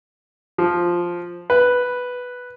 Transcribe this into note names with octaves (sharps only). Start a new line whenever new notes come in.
F3
B4